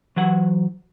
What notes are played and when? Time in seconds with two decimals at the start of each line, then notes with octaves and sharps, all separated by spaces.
0.16 E3 F#3 F#5